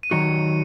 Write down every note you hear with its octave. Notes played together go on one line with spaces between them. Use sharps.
D#7
D#3 F#3 D#4 F#4 C#7